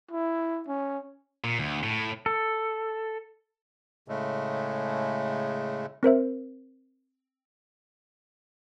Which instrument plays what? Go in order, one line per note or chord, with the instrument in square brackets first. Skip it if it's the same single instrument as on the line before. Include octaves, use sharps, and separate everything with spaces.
[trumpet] E4
C#4
[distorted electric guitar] A#2
D2
A2
[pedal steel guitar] A4
[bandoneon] A2 C#3 G#3 A3
[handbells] C4 A#4 C5 E5